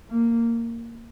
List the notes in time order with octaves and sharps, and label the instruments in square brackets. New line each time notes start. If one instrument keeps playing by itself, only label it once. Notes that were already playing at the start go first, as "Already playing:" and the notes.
[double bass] A#3